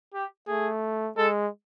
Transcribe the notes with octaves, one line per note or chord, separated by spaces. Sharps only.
G4
A3 G#4
G#3 A4